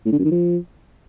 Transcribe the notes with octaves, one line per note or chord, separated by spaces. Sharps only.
A2
D3
F#2
D#3
F3